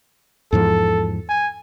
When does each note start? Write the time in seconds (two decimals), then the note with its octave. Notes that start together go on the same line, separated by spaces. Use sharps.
0.53 E2 G#2 F3 A4
1.29 G#5